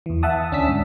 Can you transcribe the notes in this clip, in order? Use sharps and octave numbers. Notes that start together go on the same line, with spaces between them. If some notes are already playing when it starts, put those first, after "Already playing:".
E2 E3
E5 F#5 A5 D#6
D2 C#4 D4 E6 B6
G#2